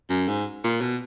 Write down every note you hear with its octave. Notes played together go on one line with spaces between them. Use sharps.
F#2
G#2
A#2
B2